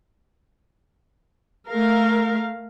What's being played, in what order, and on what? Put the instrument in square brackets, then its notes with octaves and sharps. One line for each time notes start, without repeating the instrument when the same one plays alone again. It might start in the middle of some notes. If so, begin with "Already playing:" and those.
[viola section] A3 A#4 F5